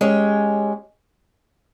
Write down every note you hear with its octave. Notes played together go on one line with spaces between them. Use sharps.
G#3 C#4 G4 C#5